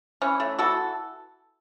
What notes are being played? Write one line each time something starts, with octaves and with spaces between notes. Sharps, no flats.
E3 C#4
A3
E3 F#4 A4